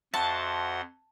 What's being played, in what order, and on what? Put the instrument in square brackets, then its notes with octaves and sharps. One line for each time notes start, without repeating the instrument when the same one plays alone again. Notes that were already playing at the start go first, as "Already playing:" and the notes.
[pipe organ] F2 F#5 C6 [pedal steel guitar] F#4 C5 E5 [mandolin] A5